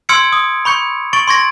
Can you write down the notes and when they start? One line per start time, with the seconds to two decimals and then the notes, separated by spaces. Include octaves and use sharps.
0.09 C6 E6 F6 G#6 C#7 D7
0.33 D#6
0.65 B5 C#6 G6 C#7
1.13 C#6 A6 D7 F#7
1.28 C6 C#6 G#6 A#6 D7